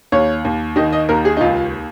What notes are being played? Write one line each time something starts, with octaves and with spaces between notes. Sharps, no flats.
D#2 C#5
D#2
D#3 D#5
D#5
D#2 A#4
G#4
D#4
C#2 F4